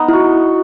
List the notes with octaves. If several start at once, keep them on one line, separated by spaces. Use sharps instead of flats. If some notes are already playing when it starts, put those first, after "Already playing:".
Already playing: B3 D#4
E4 F#4